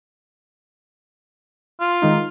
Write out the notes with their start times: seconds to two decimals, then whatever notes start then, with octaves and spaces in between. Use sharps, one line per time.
1.80 F4
2.02 D#3 G#3 D#4